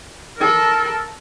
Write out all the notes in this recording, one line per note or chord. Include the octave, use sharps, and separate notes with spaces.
A4 A#4